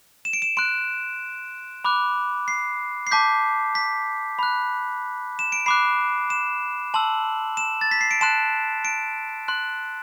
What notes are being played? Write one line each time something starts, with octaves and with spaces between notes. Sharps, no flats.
E7
D7
E7
C6 F#6 D7
B5 D6 F#6
C7
C7
A5 D6 G6 B6
B6
B5 F#6
E7
D7
B5 D6 F#6 C7
E7
A5 C6 E6 F#7
E7
A6
B6
C7
D7
A5 C6 F#6 E7
D7
C6 F#6